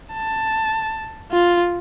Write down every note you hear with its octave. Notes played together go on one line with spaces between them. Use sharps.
A5
F4